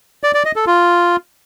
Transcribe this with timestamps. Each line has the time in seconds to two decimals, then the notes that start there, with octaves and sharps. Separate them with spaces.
0.24 D5
0.34 D5
0.45 D#5
0.56 A4
0.67 F4